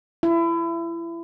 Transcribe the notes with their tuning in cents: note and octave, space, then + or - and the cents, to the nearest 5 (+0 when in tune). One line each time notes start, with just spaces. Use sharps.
E4 +30